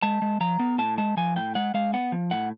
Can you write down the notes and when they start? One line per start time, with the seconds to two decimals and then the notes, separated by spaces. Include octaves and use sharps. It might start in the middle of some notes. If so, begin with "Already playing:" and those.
0.03 G#3 A5
0.22 G#3
0.41 F3 A#5
0.59 B3
0.78 A2 A5
0.98 G#3 A5
1.17 F3 G#5
1.36 A2 G5
1.55 G#3 F#5
1.74 G#3 F5
1.93 B3 F#5
2.12 F3
2.31 A2 F#5